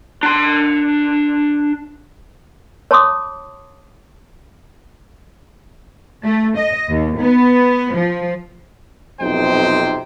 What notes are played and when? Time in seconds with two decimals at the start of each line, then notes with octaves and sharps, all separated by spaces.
0.23 D4 C6
2.91 C#5 A5 C6 D6 D#6
6.24 A3
6.57 D#5
6.89 D#2
7.19 B3
7.95 F3
9.21 B1 F2 C3 D#4 C5 G5